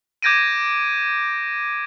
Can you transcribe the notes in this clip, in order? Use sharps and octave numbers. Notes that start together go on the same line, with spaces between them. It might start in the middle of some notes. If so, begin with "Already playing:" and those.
D6 G6 G#6 A#6 D7 D#7